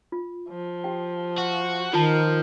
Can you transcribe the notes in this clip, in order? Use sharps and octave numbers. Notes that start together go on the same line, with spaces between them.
F4
F3
G4 G5
F#4
D#3 F3 F4 A#4 A5